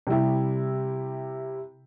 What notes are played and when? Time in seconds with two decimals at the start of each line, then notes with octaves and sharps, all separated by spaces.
0.07 C3 G3 E4 G4